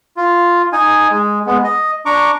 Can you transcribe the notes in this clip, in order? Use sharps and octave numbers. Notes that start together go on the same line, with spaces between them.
F4
D#4 G#5
G#3
G#3 B3
D#5
D4 A#5 C#6 D6